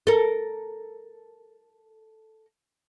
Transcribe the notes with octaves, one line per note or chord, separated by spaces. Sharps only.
A4 A#4